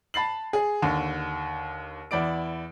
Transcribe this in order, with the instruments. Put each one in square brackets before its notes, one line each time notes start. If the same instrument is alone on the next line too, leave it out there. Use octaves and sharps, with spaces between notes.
[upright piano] A5 B5 A6 C7 F#7
G#4
D#2 D3
E2 E4 D5 D7